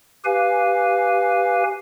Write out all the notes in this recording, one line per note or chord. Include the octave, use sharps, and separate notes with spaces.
G4 B4 F5 G#5